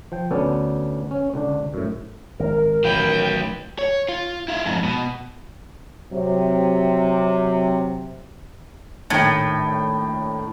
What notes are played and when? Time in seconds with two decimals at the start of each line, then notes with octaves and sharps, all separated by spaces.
0.12 F3 G5
0.31 D2 B3 C#4 A4 C5 D5
1.11 C#4
1.34 C#2 D3 D4
1.74 F#2 A2
2.40 G#1 A#4
2.84 A1 D#3 F#3 B4 G5
3.79 C#5
4.09 F4
4.48 E4 F5
4.66 F2 G#2
4.84 B2
6.13 C3 F#3
9.10 A#1 A2 D#3 G5